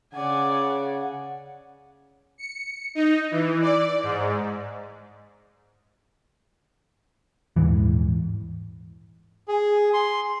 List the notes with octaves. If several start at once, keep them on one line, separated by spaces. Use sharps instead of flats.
C#3 D5 F#5 G#5
C#7
D#4
E3
D5
G#2
D#1 G#1 G#2 E3
G#4
C6